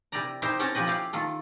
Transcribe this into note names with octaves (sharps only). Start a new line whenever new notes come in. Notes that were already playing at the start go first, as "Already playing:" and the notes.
C3 E4 G4 A#4 D5 A#5
D#4 E4 G4 A#4 C5
C4 C#4 A4 G5 A5 A#5
F3 C#4 G4 B4 D#5
E4 G4 F5
D#3 F4 A4